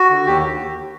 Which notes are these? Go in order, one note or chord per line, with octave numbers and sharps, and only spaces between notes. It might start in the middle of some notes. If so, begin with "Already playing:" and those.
Already playing: F#4
D3
D#2 G4